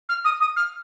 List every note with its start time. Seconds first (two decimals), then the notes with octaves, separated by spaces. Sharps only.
0.09 F6
0.24 D#6
0.40 D#6
0.56 F6